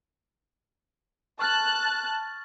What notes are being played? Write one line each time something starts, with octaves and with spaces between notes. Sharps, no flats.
A5 C#6 F6 F#6 A6